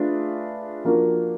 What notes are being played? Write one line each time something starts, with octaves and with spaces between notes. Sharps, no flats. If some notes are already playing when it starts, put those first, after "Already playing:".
Already playing: A3 D4 F4 G#4 B4
F3 A#3 D4 F#4 A#4